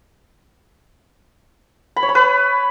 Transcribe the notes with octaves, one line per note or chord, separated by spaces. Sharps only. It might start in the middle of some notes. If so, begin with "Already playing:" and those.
B5
C#5
B5
B4